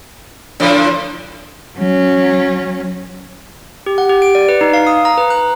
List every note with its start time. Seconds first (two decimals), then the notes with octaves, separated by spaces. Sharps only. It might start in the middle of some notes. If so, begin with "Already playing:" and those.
0.60 A2 D3 F3 D4 B5 D#7
1.78 F#3 C#4
3.86 G4
3.98 F#5
4.09 G4
4.22 D7
4.35 D5
4.49 B4
4.61 D#4
4.74 F5
4.87 D#6
5.05 A#5
5.18 B4
5.30 F#6